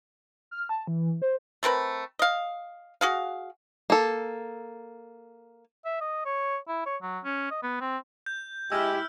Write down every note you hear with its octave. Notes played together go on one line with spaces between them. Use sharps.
F6
A5
E3
C5
A3 C4 A#4 B4
D#5 F5
F#4 G#4 F5
A#3 A4
E5
D#5
C#5
E4
C#5
F#3
C#4
D#5
B3
C4
G6
G#3 E4 G4 E6 F6